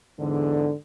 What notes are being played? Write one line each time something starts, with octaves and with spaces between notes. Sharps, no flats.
E2 G#2 D3